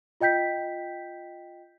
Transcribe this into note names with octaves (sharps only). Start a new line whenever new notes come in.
F4 D#5 G5 G6 B6